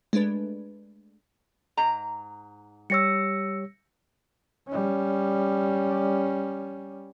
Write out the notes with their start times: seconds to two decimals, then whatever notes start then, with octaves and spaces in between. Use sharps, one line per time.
0.13 G#3 A3 D4 B4
1.77 G#2 A#5
2.90 G3 G4 C#5 E6 A#6 C#7
4.68 G3 C#4